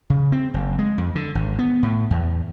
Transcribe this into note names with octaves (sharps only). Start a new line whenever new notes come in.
C#3
C4
F#1
G#3
F2
D3
G#1
B3
A2
E2